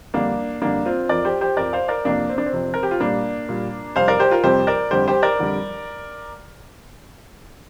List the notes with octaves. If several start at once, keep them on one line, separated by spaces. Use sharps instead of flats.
F2 D3 G3 A#3 D4
F2 D3 G3 A#3 D4
C4 F4
F2 F3 A#4 D5
G4 C5
G4 C5
F2 F3 A#4 D5
C5 F5
A#4 D5
F2 C3 F3 A#3 D4
C4
D4
C4
F2 C3 F3
A#4
G4
F4
A#2 G3 A#3 D4
A#2 G3
F2 C3 G3 C5 F5
A#4 D5
G4 C5
F4 A#4
F2 C3 G3 G4 C5
A#4 D5
F2 D3 G3 G4 C5
G4 C5
A#4 D5
F2 D3 G3